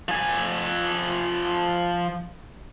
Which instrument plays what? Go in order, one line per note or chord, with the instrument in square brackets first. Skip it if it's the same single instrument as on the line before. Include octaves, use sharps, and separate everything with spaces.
[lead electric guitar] F3 G#5